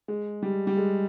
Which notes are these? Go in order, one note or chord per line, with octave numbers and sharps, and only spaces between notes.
G#3
G3
G3
G#3